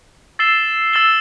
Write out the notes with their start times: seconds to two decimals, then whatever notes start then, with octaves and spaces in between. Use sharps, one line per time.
0.39 E6 A6 C7 E7 G7
0.93 E6 A6 E7 G7